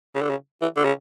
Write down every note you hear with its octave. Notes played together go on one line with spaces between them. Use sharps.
C#3
D3
C#3
E3
D3
C#3